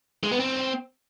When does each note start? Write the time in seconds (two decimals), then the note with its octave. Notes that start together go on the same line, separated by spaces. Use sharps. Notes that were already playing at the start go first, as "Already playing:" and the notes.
0.24 G#3
0.32 B3
0.40 C4